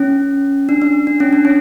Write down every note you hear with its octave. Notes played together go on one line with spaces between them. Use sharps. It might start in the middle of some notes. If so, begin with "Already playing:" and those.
Already playing: C#4
D4
D4
D4
C#4
D4
C#4